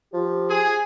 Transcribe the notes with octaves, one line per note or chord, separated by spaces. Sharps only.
F3 G4
G#4